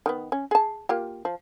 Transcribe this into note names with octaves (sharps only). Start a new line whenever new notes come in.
D#3 F#3 B3
C#4
G#4 A5
A#3 F4 G4
F3